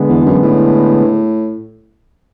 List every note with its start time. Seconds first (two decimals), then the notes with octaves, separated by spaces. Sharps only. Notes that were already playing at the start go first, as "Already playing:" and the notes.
Already playing: D3 G#3 B3
0.09 E2
0.25 F#2
0.43 A2